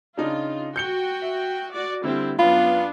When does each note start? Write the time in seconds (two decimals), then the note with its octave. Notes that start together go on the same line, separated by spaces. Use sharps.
0.17 C#3 D4 D#4 F4
0.76 F#4 G5 G6 C#7 G7
1.22 E5
1.71 F#4 D5
2.04 D3 G3 C4 E4
2.39 F#2 B3 D4 F4 B5